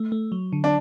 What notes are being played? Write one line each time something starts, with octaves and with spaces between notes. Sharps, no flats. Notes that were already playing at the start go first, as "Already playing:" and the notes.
Already playing: A3
A3
F#3
D3
D4